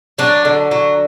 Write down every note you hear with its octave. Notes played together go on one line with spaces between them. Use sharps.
F#3 D4
D3
F#3